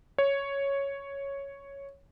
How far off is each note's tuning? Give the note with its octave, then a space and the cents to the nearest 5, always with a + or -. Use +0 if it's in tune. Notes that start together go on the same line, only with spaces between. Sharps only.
C#5 +0